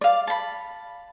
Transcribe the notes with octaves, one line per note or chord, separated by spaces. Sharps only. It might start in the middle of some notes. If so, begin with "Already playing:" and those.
D5 F5
A5 B5